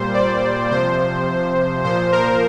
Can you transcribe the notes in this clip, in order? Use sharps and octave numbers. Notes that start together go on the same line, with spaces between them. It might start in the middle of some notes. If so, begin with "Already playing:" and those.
Already playing: A#2 G3 C5
D5
C3 F3 C5
A#2 F3 C5
A#4